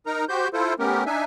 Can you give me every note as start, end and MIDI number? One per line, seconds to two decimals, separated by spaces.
0.06 0.25 63
0.06 0.25 70
0.06 0.25 82
0.29 0.48 66
0.29 0.48 67
0.29 0.48 72
0.29 0.48 91
0.53 0.74 64
0.53 0.74 65
0.53 0.74 69
0.53 0.74 72
0.79 1.04 57
0.79 1.04 59
0.79 1.04 61
0.79 1.04 67
0.79 1.04 70
1.06 1.24 62
1.06 1.24 63
1.06 1.24 76
1.06 1.24 80